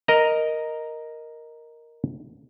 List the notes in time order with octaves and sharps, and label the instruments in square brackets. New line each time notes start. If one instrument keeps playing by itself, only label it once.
[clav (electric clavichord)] A#4 D#5 A#5